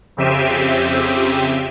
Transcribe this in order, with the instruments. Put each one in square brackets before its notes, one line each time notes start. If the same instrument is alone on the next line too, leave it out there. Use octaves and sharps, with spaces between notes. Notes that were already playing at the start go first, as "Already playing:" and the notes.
[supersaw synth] F2 C#3 C4 G4 E5 D#7